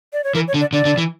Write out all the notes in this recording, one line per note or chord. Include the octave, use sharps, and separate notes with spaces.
D5
C#5
E3 A#4
C#5
D3
D5
D3 D5
D3
E3